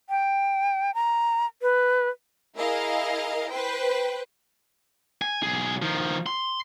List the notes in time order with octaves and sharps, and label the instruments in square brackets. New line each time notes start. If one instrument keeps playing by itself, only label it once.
[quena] G5
A#5
B4
[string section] E4 G#4 A#4 D#5 F5
B4 C5 G5
[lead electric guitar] G#5
B1 G#4
D#3 F3
C6